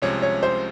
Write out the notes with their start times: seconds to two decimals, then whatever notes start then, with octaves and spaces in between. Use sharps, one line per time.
0.02 C2 C3 F3 G#3 C#4 C#5
0.22 C#5
0.43 C5